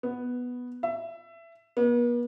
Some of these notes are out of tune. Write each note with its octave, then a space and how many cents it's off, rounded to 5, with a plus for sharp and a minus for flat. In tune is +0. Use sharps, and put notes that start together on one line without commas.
B3 +0
E5 +20
B3 -45